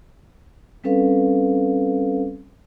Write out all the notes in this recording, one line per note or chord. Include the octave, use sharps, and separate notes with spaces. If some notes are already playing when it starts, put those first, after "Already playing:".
G3 C4 C#4 A4 B4 F5